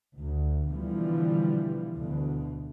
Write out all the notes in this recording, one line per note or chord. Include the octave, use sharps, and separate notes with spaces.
D2
B2 D3 E3 F3 G3
D2 B2